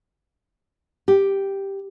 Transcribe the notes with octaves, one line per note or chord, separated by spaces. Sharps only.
G4